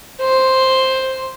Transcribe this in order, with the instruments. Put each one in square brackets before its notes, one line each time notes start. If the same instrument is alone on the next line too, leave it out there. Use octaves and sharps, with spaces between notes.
[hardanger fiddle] C5